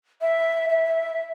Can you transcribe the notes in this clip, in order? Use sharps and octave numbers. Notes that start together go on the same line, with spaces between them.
E5
E5